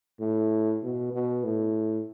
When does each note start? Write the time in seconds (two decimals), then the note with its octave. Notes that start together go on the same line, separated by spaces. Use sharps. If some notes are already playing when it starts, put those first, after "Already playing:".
0.20 A2
0.83 B2
1.13 B2
1.44 A2